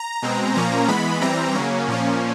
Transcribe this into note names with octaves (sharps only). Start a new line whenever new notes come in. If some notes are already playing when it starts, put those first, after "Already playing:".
Already playing: A#5
B2 G#3 C4
A#2 F3 A#3 C#4 A#5
E3 G#3 B3 B5
E3 G3 C4 A#5
C#3 F#3 A#3 C#4
A#2 F3 A#3 C#4